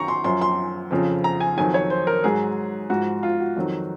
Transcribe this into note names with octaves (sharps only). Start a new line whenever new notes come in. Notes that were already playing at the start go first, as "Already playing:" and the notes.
Already playing: F#2 D#3 F#3 A#5 C#6
C6
F#2 F3 C6
C6
F2 C#3 F3
A#5
G#5
F2 D#3 F#3 G#5
C#5
C5
A#4
G#2 F#3 G#4
G#2 F3 F#4
F4
F#4
F2 D#3 F#3